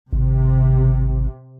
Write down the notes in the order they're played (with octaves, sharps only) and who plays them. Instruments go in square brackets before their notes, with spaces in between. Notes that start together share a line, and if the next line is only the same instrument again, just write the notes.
[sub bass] G#1 [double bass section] C3